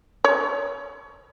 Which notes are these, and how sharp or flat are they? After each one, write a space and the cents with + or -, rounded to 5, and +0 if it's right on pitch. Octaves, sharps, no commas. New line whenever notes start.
C#5 +25